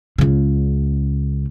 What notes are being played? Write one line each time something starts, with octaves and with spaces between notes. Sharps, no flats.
C#2 C#3